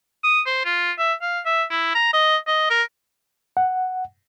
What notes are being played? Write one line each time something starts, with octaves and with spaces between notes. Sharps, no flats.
D#6
C5
F4
E5
F5
E5
E4
A#5
D#5
D#5
A#4
F#5